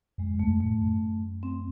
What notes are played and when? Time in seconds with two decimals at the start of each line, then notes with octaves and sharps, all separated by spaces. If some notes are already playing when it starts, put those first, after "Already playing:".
0.18 F#2 G#3
0.34 F#2
0.39 E2 A3
0.49 F#2
0.60 A2 A3
0.81 F#2
1.43 C4